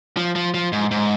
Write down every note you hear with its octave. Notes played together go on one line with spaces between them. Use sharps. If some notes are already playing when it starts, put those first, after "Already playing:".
F3
F3
F3
G#2
G#2